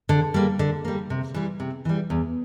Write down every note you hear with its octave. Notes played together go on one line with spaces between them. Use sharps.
D3
G3 A#3
D3
G3 A#3
C3
E3 G3
C3
E3 G3
E2